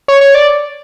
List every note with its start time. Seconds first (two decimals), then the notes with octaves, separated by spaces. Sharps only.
0.08 C#5
0.21 C#5
0.35 D5